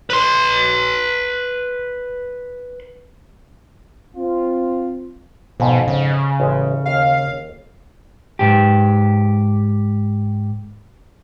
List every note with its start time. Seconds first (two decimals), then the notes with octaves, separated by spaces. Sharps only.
0.10 B4 C6
4.16 C4 F4
5.60 F2 G#2 B2
5.88 C#3
6.40 A1 G#3
6.85 D#2 F5 G#5
8.39 G#2 G4